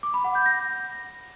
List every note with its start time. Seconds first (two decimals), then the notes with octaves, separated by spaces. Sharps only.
0.03 D6
0.14 B5
0.24 F#5
0.35 G6
0.46 A#6